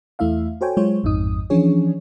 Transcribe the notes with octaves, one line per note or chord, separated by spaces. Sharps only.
E2 A3 E4 E5 F5
F#4 A4 C5 C#5 G5 G#5
F#3 G#3 F4 C5 C#5
A1 F2 G#2 D#4 D#6
E3 F3 C#4 D4 G#4 C#5